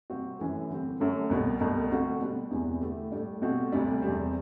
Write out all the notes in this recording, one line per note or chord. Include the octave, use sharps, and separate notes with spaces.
C3 G3 C4 F#4
F#2 E3 A3
D3 G3 C4
F#2 D3 F#3 A3
C2 B2 G3 D4
C2 B2 A3 C4
D3 A3 C4 F#4
B2 G3 D4
E2 C3 E3 B3
D3 A3 E4 G4
A2 G3 D4
B2 A3 C4 F#4
D2 C3 G3 D4
E2 C3 G3 C4